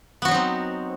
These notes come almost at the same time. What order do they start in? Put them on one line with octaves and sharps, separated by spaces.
B3 F#4 F#3 D#4 C4